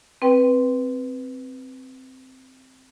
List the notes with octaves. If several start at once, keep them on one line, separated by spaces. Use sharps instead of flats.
C4 B4 G5